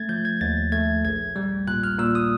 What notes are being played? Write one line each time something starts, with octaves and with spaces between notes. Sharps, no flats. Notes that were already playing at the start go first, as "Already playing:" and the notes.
Already playing: A3 G#6 A6
F3 G6
G#6
D#2 A6
A3 G#6
A#1 G#6
G3
A#2 F#6
F6
A#2 E6
D#6